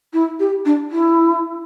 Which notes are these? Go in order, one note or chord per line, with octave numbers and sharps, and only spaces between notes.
E4
G4
D4
E4